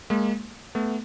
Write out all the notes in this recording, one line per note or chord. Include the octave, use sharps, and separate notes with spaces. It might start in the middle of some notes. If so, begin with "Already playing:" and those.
G#3 A#3
A3 B3